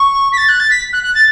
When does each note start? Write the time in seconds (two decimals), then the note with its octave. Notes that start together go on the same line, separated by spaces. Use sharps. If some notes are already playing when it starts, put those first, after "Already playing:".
Already playing: C#6
0.33 B6
0.37 A6
0.48 F#6
0.60 A6
0.70 B6
0.93 F#6
1.03 F#6
1.15 A6